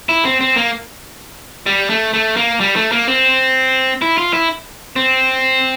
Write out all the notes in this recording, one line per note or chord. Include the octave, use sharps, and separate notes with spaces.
E4
C4
C4
A#3
G3
A3
A3
A#3
G3
A3
A#3
C4
E4
F4
E4
C4